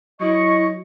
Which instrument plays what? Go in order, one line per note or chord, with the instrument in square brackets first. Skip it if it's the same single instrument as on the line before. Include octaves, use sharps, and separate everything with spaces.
[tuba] F#3 [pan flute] E4 [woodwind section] D#5 C#6